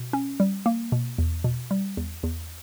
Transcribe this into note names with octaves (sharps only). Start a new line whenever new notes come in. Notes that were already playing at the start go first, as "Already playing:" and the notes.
Already playing: B2
C#4
G3
A#3
B2
E2
B2
G3
E2
E2